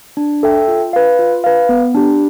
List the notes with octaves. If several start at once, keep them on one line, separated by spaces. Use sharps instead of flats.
D4
A4 E5 G5
F4
B4 F5
F4
B4 F5
B3
D4 G4